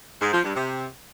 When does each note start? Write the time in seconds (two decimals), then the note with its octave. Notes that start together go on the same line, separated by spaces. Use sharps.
0.22 G#2
0.33 F3
0.44 G2
0.56 C3